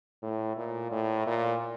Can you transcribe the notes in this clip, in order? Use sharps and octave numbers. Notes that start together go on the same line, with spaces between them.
A2
A#2
A2
A#2